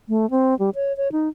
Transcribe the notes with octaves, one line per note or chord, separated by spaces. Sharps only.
A3
C4
G3
C#5
C#5
D#4